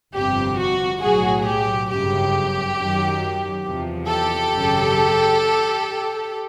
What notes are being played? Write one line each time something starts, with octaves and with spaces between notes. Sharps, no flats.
G1 F2 C3 G4
F#4
B1 A2 F#3 F#4 G#4
G4
G1 F#2 C#3 G4
F#2 D#3 F#3
E2 C3 F3
G4 A4
G#1 F#2 C#3